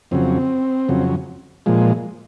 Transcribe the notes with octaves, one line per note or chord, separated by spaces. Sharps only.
F2 C#3 F#3 C4
F2 C#3 F#3
A#2 F3 G#3